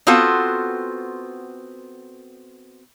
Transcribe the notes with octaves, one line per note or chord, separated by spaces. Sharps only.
B3 C4 F4 F#4 A4